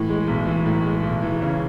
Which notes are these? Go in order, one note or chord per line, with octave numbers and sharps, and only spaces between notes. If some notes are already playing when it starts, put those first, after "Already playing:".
Already playing: A2 E3
G#3
B1
E3
A2
G#3
B1
E3
C#3